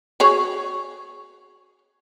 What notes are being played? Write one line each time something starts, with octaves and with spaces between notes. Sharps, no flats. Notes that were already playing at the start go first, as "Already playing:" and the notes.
F#4 G#4 C#5